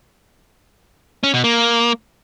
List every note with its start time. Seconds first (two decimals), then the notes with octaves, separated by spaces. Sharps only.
1.23 C#4
1.34 B2
1.44 A#3